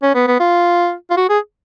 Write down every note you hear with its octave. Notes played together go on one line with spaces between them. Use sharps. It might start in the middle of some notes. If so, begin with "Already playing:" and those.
C#4
B3
B3
F4
F4
F#4
G#4